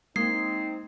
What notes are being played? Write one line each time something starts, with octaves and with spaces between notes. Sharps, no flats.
G#3 A#3 C4 D#4 C7